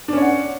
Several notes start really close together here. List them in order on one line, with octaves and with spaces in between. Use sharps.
D4 C#4 C#5 F#5